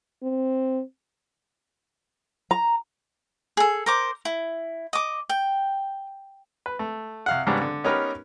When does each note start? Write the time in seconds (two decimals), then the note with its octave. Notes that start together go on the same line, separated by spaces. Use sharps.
0.23 C4
2.51 A#5
3.57 G#4 A4
3.86 A#4 C5 D6
4.25 E4
4.93 D#5 D6
5.29 G5
6.66 B4
6.79 A3
7.26 C2 F5 F#5
7.47 G#2 C#3 G3 B3 D4 G4
7.61 D3
7.84 B3 C#4 D#4 G4 A#4 B4